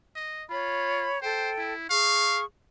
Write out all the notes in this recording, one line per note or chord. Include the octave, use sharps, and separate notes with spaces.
D#5
F4 C#5 B5
A4 C5 G5
E4
G#4 F5 C#6